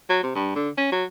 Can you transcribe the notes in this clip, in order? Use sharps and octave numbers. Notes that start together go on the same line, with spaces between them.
F#3
C3
G2
D3
C#4
F#3